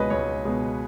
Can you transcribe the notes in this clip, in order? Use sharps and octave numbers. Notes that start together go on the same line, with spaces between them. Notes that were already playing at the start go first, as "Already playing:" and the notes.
Already playing: C#2 B2 G#3 B4 C#5 D#5
C#2 C#5
B2 G#3